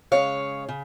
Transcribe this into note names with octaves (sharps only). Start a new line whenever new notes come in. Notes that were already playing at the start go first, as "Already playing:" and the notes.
C#3 G#3 C#5 F5
C#3